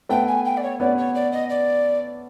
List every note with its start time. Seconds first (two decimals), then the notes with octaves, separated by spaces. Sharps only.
0.09 A3 B3 G5
0.28 G#5
0.45 G5
0.57 D5
0.63 C#5
0.80 B3 C#4 D5
0.98 C#5
1.15 D5
1.32 D#5
1.49 D5